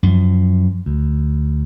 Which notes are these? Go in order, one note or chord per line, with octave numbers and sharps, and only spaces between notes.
F#2 F3
D2